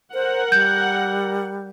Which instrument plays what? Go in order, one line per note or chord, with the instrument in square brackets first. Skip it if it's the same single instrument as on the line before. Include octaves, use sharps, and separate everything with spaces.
[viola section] A#4 F#5 [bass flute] C5
[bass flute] G3 [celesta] G6